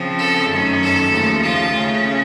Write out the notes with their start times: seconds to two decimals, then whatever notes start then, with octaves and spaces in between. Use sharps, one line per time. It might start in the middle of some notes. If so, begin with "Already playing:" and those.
Already playing: C#3 F3 C4
0.18 A4
0.49 F#2 D#3 A3 C#4
0.81 A4
1.12 D#2 C#3 F3 A3
1.43 F4
1.74 C#3 A3 C#4